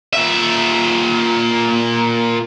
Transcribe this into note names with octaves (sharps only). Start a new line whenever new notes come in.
A#2 E5